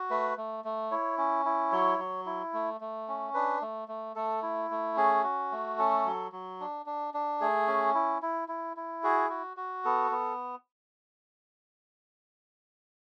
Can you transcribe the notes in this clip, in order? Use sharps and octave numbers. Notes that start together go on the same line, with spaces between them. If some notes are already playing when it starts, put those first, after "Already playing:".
Already playing: F#4
A3 B4
A3
A3
E4 C#5
C#4
E4
F#3 C#5
F#3
E4
A3
A3
C#4
D4 B4
A3
A3
A3 A4
E4
A3
C#4 G#4
F#4
A3
C#4 A4
F#3
F#3
D4
D4
D4
A3 G#4
C#4
E4
E4
E4
E4
F#4 G#4
F#4
F#4
B3 A4
B3